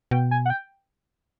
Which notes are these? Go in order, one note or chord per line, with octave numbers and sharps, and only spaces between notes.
B2 G5
G#5
F#5
G5